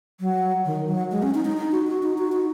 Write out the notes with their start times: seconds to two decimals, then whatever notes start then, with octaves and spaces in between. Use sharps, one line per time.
0.20 F#3
0.66 D#3
0.88 F#3
1.11 G#3
1.22 C#4
1.34 D#4
1.45 D#4
1.57 D#4
1.72 F#4
1.87 F#4
2.03 D#4
2.18 F#4
2.32 D#4